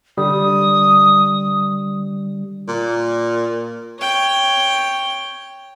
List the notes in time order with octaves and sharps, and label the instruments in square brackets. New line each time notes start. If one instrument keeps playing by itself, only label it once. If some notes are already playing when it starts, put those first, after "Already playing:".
[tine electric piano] D3 G3 [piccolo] D#6
[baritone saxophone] A#2
[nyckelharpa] C#5 G5